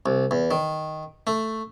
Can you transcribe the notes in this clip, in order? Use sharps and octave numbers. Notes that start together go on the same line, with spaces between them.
C2
E2
D#3
A3